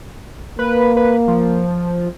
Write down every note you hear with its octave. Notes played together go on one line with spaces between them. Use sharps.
A#3 B4
B4
F3